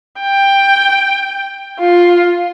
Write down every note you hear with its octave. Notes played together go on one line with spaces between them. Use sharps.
G5
F4